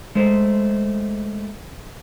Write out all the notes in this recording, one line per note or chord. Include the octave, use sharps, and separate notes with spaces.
G#3 A3 C5